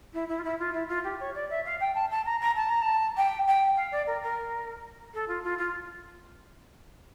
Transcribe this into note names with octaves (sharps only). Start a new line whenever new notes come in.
E4
E4
F4
E4
F4
E4
F4
G4
C#5
D5
E5
F5
G5
A5
A5
A#5
A#5
A5
A#5
A5
G5
G5
F5
D5
A#4
A#4
A4
F4
F4
F4